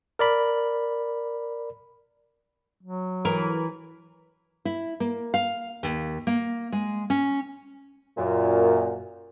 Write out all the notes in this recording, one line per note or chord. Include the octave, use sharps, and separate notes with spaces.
A#4 D5 B5
F#3
E3 A#4
E4
A#3
F5
D#2
A#3
G#3
C#4
F#2 A#2